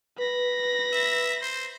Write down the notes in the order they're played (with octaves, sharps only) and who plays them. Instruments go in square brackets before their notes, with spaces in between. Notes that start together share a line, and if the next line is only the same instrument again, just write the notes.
[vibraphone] B4 [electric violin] B5 A#6
[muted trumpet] E5
C5